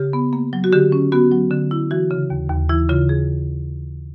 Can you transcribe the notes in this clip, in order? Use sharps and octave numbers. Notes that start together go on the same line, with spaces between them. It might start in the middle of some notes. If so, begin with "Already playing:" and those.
Already playing: C#3 G4
B3
A#3
F#3
F#4
D3 G4
C#4
B3 F#4
F#3
D3
E4
E3 F#4
C#3
D#2
D#2
E3 E4
C#3 F4
G#4